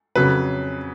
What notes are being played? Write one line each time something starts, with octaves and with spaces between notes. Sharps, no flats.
F2 C#3 F#3 B4